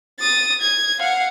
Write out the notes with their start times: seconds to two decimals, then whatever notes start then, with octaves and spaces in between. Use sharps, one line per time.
0.19 D#6 A6
0.61 G#6
0.99 F5 F#5